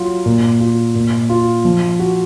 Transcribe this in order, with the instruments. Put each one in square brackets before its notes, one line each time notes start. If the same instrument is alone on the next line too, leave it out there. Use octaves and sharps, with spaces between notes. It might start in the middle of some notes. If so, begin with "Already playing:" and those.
Already playing: [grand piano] F#3 F4
A#2
F4
A#2
F4
F3
F#4